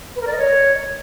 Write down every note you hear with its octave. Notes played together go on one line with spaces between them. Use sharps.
B4
A#4
D5
D#5
C#5